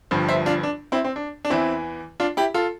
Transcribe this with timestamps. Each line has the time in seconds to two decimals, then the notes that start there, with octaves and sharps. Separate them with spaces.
0.11 G1 G2 F3
0.29 C5 E5
0.46 D4 F4
0.63 D4
0.92 C4 E4
1.04 C4
1.16 D4
1.45 D4
1.50 E2 E3 C4 E4
2.20 D4 F4
2.37 E4 G4
2.54 F4 A4